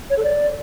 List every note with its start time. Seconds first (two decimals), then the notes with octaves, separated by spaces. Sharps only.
0.10 C#5
0.16 A4
0.23 D5